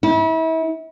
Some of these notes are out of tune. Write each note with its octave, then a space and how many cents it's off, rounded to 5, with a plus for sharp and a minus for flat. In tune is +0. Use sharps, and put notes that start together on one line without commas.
E4 -35